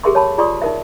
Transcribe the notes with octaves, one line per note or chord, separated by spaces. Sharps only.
G4 G#4 A#4 E5 C6 C#6
C#5 A5 B5
F4 G#4 D5 C6 C#6 D#6
D#4 A#4 E5